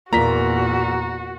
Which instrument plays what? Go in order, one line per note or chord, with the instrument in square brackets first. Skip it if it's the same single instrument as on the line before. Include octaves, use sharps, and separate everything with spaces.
[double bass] E2 A#2 [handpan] A#3 F4 D5 [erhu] F#4 [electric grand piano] A#5 B6